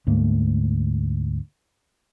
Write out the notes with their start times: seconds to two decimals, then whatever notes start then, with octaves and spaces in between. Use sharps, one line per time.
0.07 D2 G#2 A3 A#3